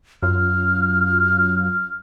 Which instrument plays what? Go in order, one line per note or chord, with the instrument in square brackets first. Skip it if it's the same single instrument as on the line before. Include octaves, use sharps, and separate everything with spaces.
[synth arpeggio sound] F#2 F4 [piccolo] F6